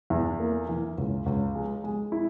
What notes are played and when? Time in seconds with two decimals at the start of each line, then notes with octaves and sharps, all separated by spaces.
0.10 E2
0.40 A#3
0.69 E3
0.98 C#2
1.26 C#2
1.55 G#3
1.84 G#3
2.12 E4